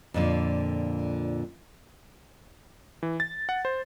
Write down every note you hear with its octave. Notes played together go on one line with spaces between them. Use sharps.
F2 A#2 D3
E3
A6
F#5
C5